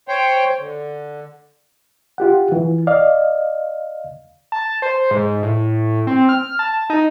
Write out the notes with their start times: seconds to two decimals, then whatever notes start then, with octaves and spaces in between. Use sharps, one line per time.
0.08 C5 C#5 G5
0.59 D3
2.18 F4 G4 F#5
2.52 E3
2.87 D5 D#5 F5
4.52 A5
4.82 C5
5.11 G#2
5.43 A2
6.07 C4
6.29 F6
6.59 A5
6.90 D#4